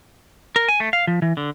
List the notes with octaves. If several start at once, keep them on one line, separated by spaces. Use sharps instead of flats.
A#4
G#5
A3
F5
F3
E3
D3